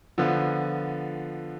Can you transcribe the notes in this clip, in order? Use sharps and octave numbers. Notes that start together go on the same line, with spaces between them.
D3 F3 B3 F4